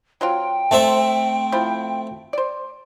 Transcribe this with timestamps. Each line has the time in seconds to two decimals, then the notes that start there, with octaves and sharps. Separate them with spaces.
0.21 F#3 C4 F4 G5
0.71 A3 C4 C5 E5 A5
1.52 F3 E4 C5
2.33 C5 D5